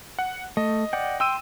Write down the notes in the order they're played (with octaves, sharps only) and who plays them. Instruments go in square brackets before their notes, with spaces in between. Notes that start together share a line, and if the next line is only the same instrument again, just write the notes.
[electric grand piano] F#5
[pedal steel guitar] A3 [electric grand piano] D#5
[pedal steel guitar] D5 F#5 G5
[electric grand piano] G5 E6 D#7 [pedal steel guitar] C6